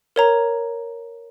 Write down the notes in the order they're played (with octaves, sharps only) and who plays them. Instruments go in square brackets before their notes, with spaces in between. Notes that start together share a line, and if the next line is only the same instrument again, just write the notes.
[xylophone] A#4 C#5 A#5